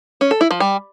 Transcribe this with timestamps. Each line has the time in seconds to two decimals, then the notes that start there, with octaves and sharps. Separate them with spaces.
0.21 C#4
0.31 A4
0.41 E4
0.51 F3
0.60 G3